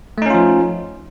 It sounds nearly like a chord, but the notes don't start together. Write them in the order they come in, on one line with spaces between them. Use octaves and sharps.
A3 D#4 C#4 F4 F3